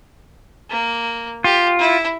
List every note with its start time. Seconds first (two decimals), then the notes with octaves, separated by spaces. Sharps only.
0.70 A#3
1.44 F4 G4
1.79 E4